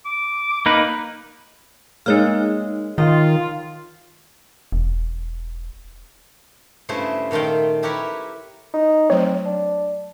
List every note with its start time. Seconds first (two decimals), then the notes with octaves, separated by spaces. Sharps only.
0.05 D6
0.66 A#3 D#4 B4
2.06 G#3 A#3 D#4 C#5 F6
2.98 D#3 F4 D#5
4.72 E1
6.89 G2 C#3 A3 E4 C5
7.31 A#2 D#3 A3 F4 G5
7.83 E4 G4 A#4 B4 C#5
8.74 D#4
9.10 F#3 A3 C4 C#5
9.45 D4